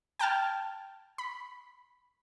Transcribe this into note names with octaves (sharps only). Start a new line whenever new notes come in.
G5 A5 F6 G#6
B5